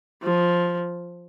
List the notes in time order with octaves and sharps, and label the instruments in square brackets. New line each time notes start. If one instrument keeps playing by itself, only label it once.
[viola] F3